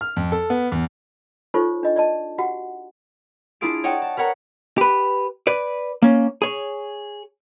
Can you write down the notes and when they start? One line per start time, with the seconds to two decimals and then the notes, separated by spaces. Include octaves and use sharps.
0.01 F6
0.16 F2
0.32 A4
0.50 B3
0.72 E2
1.54 D#4 F4 A4 C5 C#5 C#6
1.83 D4 D#5
1.96 D5 D#5 A5
2.38 F#4 G4 F#5
3.61 D4 E4 F4 G#4 D7
3.84 C#5 D#5 F#5 G5 A5
4.02 A5
4.17 A#4 B4 C#5 F#5 A#5
4.78 G4 B4
5.47 B4 D5
6.02 A#3 C#4
6.42 G#4 C#5